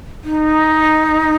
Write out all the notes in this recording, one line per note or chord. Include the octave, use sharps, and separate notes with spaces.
D#4